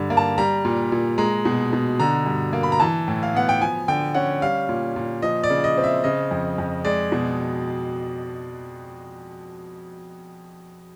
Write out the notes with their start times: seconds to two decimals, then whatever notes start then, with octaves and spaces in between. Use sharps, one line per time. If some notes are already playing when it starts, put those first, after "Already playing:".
Already playing: G2 D3
0.10 A#3
0.17 A5
0.38 G3 A#5
0.65 A#2
0.92 A#2
1.18 G#3 A#5
1.45 B2
1.73 B2
2.00 D3 A#5
2.26 G2
2.53 A#3
2.63 B5
2.72 A#5
2.80 E3 A5
3.08 A2
3.23 F5
3.35 B3 F#5
3.49 G5
3.61 F3 G#5
3.88 D3 G5
4.15 C#4 F#5
4.42 G3 F5
4.69 A#2
4.96 A#2
5.22 F3 D#5
5.44 D5
5.50 C#3
5.64 D#5
5.78 C4
5.84 E5
6.04 C#3 D#5
6.31 F2
6.58 F2
6.85 G#3 D5
7.12 B2